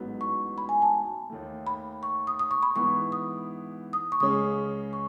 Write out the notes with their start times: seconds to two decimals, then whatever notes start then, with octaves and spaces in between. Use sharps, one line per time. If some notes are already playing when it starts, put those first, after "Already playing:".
Already playing: A1 G#2 F#3 B3
0.21 C#6
0.58 B5
0.69 G#5
0.82 A5
1.30 D#2 D#3 A3
1.67 B5
2.03 C#6
2.27 D#6
2.39 D#6
2.51 C#6
2.63 B5
2.75 G#2 E3 B3 C#6
3.12 D#6
3.93 D#6
4.12 C#6
4.20 C#2 C#3 G#3 C#4 D#6
4.93 C#6